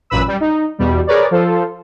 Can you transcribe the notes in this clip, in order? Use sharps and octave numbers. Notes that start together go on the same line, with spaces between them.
A1 F#2 A#2 B4 B5 E6
G3
D#4
E2 B2 G3
G#4 A#4 B4 C#5 D5
F3 F4 A4 C5